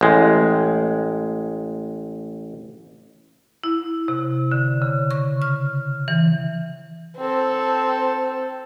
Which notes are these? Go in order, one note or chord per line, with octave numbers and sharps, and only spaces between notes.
A1 G#3
E4
C3
D3
C#3
C#6
F6
E3
C4 A4